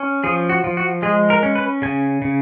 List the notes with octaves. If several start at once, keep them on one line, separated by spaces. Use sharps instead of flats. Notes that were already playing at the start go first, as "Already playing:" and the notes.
Already playing: C#4
F3 G#4
F#4
F3
F#4
G#3 G#4
A#4
C#4
B4
C#3 G#5
C#3